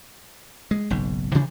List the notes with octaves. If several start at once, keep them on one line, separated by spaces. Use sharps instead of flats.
G#3
F#1 B1 G#2
C3 E3 F3 D4